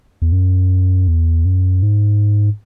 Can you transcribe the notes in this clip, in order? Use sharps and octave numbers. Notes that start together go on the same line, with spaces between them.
E2
F#2
E2
F#2
G#2